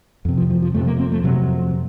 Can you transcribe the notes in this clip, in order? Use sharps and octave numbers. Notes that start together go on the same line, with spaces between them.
F2 C3
F3
F3
F3
F2 C3 A3
A#3
C4
A3
F2 C3 F#3